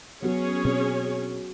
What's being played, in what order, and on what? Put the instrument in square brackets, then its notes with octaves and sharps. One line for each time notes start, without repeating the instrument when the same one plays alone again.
[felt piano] F#3 B3 F#4 [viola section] C#4 G#4 C#5
[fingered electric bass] B2 C4